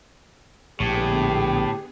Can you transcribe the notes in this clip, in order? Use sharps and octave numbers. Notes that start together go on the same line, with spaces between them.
A#1 A2 D3 B3 G4 G#4